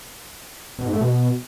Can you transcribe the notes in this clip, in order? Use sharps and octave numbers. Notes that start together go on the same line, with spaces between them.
B2
G#2
A3
B2